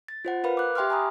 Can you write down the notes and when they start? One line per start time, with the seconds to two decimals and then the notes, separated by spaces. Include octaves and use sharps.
0.08 A6
0.25 F4 C5 F#5
0.44 A#4 B4 F5 B5
0.57 D6 F#6
0.75 G4 E5 G5 C6 D6 F6
0.90 G#5 A#5 B5 D#6